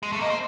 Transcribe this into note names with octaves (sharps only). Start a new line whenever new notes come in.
G#3
A3
A#3 D#5
C4